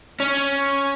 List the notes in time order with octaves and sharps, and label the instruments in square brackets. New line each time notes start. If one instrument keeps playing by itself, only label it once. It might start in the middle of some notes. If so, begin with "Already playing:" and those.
[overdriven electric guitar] C#4